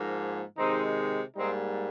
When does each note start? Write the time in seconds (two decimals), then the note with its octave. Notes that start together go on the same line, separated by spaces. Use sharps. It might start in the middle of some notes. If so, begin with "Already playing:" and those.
Already playing: G#2 F3 A#3
0.57 C3 D#3 G#3 C4 D#4
1.37 G#2 G3 A#3 C4 D#4